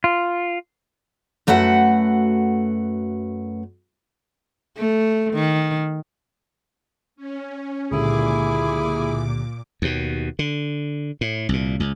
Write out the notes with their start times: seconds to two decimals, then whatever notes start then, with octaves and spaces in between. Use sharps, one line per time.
0.04 F4
1.47 F#2 A3 F#4 B4 F#5
4.77 A3
5.33 D#3
7.16 C#4
7.91 C#2 A#2 D3 E4 G4 G#4 D6
9.82 D#2 B2
10.39 D3
11.21 A2
11.49 C2 A#2
11.80 C#2